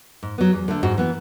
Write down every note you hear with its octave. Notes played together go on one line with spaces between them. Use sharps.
G#2
F#3 B3
E2
D3 A3
G#2 F#4
E3 B3